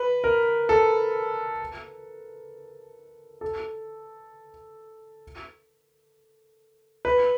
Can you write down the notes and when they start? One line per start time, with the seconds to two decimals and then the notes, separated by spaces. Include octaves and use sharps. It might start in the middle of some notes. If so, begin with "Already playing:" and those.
Already playing: B4
0.24 A#4
0.69 A4
3.41 A4
7.05 B4